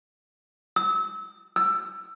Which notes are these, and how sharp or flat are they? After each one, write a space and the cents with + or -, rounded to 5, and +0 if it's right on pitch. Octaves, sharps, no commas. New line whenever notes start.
E6 -30
E6 +20